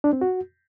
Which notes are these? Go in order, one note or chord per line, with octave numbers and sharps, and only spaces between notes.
D4
C4
F#4